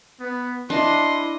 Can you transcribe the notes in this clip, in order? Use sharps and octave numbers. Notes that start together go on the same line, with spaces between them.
B3
D4 E4 D#5 C6